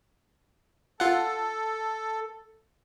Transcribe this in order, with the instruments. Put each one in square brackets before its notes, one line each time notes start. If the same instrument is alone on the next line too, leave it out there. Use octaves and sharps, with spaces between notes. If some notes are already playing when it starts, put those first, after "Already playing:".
[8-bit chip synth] F4 F#5 [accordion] A4